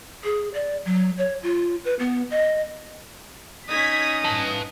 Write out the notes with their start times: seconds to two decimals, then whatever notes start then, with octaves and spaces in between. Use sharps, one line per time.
0.24 G#4
0.54 D5
0.85 F#3
1.18 C#5
1.43 F4
1.85 B4
1.99 B3
2.31 D#5
3.68 C#4 D#4 D#6 G#6 B6
4.24 G2 B4 A5